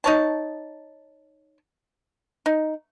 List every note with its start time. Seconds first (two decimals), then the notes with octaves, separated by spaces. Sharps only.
0.04 D#4 C#5 A5
2.46 D#4